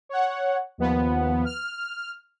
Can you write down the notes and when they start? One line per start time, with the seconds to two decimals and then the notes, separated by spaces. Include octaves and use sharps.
0.09 C#5 F#5
0.78 D#2 F3 B3
1.45 F6